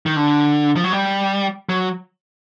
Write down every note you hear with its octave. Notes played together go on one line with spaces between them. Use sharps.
D#3
D3
F3
F#3
G3
F#3